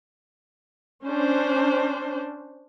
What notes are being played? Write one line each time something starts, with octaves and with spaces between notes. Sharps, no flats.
C#4 D4 C5